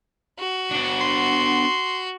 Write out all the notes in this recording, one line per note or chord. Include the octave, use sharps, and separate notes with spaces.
F#4
B3 D4
C6